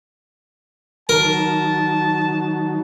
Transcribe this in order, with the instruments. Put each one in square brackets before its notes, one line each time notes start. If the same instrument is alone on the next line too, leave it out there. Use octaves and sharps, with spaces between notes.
[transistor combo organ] D#3 F#3 [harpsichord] A#4 [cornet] A5